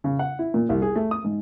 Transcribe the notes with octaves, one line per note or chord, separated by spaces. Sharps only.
C#3
F#5
E4
A#2
C2
G#4
A3
D#6
G#2